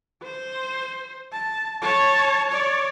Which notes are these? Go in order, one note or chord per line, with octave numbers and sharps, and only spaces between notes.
C5
A5
C#5 A5
C#5 D5